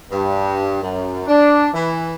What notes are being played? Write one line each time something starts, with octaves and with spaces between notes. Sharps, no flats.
G2
F#2
D4
E3